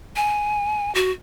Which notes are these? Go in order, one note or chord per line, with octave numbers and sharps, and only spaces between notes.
G#5
F#4